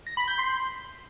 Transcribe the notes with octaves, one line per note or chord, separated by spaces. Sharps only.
A#6
B5
G6
C6